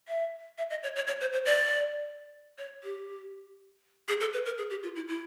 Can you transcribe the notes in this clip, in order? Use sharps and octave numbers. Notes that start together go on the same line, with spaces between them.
E5
E5
D#5
C#5
C#5
C#5
C5
C5
D5
C#5
G4
G#4
A4
B4
A#4
G#4
G4
F4
E4
E4